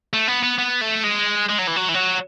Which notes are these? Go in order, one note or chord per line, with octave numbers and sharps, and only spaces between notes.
A3
B3
B3
B3
A3
G#3
G#3
F#3
E3
F#3
E3
F#3